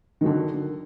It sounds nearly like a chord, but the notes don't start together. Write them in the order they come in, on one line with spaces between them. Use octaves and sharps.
D#3 F#3 D3